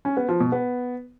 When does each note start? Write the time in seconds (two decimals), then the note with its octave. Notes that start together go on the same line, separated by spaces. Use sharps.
0.05 C#4
0.17 B3
0.29 F3
0.40 B2
0.52 B3